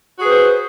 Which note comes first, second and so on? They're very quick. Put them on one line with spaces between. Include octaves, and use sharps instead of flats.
F#4 G#4 B4 C5